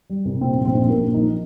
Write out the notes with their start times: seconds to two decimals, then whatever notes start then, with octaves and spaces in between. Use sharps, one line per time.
0.10 G3
0.25 C2
0.41 A#2 C4
0.58 A#1
0.65 C4
0.74 A#1
0.84 C4
0.90 A#1 A#3
1.06 A#1
1.14 D#4
1.22 F3